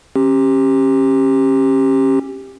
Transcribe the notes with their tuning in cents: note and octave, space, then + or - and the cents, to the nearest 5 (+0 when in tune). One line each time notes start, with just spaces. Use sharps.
C#4 -35 G4 +0